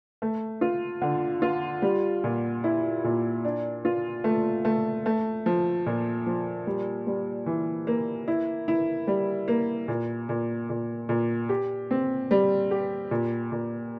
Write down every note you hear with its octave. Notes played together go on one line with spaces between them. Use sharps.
A3
F4
D3
F4
G3
A#2
E4
A#2
D4
F4
A3
A3
A3
F3
A#2
F3
G3
G3
E3
A#3
E4
E4
G3
A#3
A#2
A#2
A#2
A#2
G4
C4
G3
G4
A#2
A#2